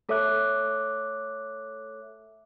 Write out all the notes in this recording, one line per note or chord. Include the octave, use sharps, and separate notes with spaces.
A3 A4 C#5 E5 D6 F#6